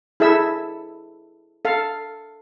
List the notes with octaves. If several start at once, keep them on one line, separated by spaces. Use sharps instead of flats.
E4 G#4 A4 E5 E6
A4 F5